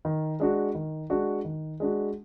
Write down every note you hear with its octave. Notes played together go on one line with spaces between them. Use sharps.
D#3
G#3 D4 F#4
D#3
G#3 D4 F#4
D#3
G#3 D4 F#4